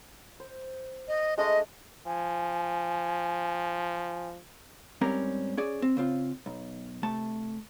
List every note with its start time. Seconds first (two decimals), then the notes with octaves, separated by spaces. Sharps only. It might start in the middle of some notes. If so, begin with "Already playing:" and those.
0.40 C5
1.08 D#5
1.38 G#3 A3 D4 D#5
2.06 F3 G#5
5.01 G#2 G3 C4 C#4 A#4 A#5
5.57 C#4 G#4 D5
5.82 C4
5.97 C#3 C4 F4
6.46 B1
7.03 C3 A3 A5